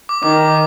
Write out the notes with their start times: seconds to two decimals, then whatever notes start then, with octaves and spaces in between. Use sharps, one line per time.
0.09 D6
0.23 D#3 D6